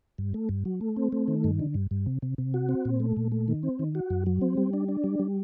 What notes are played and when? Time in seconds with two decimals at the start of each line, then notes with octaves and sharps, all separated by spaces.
0.18 G2
0.34 A3
0.49 G2
0.65 F#3
0.81 A3
0.96 C4
1.12 A3
1.28 D#3
1.44 G2
1.59 D3
1.74 G2
1.91 G2
2.06 C3
2.22 C3
2.38 C3
2.54 F#4
2.69 C4
2.85 A#2
3.00 A3
3.17 A#2
3.32 A3
3.48 D#3
3.63 C4
3.79 D#3
3.95 F#4
4.10 F#2
4.26 F#3
4.41 C4
4.57 G3
4.73 D4
4.88 D4
5.04 G3
5.19 G3